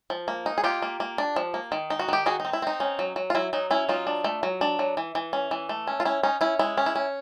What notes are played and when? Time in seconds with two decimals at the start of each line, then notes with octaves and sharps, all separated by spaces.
0.10 F3
0.28 A#3
0.46 D#4
0.58 G#4
0.63 A#3 F4 G4
0.82 A#3
1.00 A#3
1.18 D4
1.36 F3
1.54 A#3
1.72 D#3
1.90 D#4
1.99 F#4
2.08 D#3 G4
2.26 D#4 F#4 G#4
2.40 D#4
2.45 C4
2.53 E4
2.62 C4 D#4
2.80 C#4
2.99 F#3
3.16 F#3
3.30 F4
3.35 F#3 E4
3.53 F#3 D#4
3.71 C#4 E4
3.89 F#3 D#4 F4
4.07 D4
4.24 A3
4.43 F#3
4.61 D4
4.79 F#3
4.97 E3
5.15 E3
5.33 C#4
5.51 E3
5.69 A3
5.87 C#4
6.00 F4
6.05 C#4 E4
6.23 C#4 D#4
6.41 C#4 E4
6.59 G#3 E4
6.77 C#4
6.86 E4
6.95 C#4